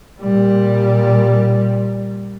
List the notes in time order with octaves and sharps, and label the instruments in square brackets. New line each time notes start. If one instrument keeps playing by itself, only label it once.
[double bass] A#2 G3